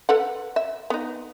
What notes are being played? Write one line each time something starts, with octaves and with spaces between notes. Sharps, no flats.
A4 B4 F#5
E5
B3 D#4